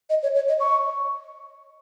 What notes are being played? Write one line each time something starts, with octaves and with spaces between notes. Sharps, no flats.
D#5
C#5
C#5
D#5
C#6